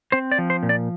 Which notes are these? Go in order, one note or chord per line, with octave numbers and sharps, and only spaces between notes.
C4 C5
D5
F3
C5
A#2
D5